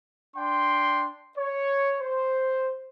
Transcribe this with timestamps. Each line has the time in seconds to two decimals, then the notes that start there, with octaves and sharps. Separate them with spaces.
0.37 D4 G5 C6
1.37 C#5
2.01 C5